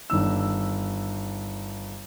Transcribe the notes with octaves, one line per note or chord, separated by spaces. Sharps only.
G1 D#3 D4 E6